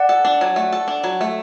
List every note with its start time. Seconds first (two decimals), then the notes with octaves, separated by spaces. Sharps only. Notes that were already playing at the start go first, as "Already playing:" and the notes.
Already playing: D5 F#5
0.09 A4
0.25 D4
0.41 F#3
0.56 A3
0.73 A4
0.88 D4
1.04 F#3
1.21 A3